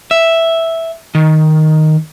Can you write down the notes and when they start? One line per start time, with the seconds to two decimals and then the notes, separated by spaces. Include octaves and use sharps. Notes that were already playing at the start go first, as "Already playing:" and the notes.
0.11 E5
1.15 D#3